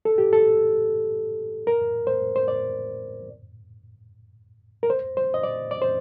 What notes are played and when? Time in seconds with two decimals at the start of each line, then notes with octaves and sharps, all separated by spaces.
0.05 A4
0.18 G4
0.33 A4
1.67 A#4
2.07 C5
2.36 C5
2.48 D5
4.83 A#4
4.90 C5
5.17 C5
5.34 D#5
5.43 D5
5.71 D5
5.82 C5